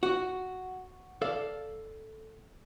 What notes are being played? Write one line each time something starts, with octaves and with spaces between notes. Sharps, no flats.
F#4
A4 D5 F5